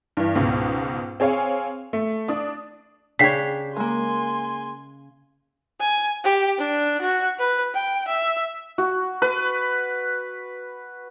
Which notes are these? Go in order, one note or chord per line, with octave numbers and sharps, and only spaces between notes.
G2 E3
C#2 G#2 B2
C4 G#4 C#5 F5 G#5
A3
D4 D#6
C#3 D4 G4 C#5 B6 C7
G#3 A#3 G#5 C6
G#5
G4
D4
F#4
B4
G5
E5
F#4
B4